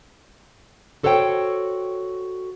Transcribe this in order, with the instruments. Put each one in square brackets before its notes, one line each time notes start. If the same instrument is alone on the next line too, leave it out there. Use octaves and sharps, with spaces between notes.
[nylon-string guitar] F#4 A4 C5 C#5 F5 G5